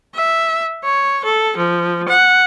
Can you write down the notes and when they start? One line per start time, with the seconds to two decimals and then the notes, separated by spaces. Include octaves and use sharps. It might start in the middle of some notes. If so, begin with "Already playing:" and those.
0.15 E5
0.84 C#5
1.24 A4
1.57 F3
2.08 F#5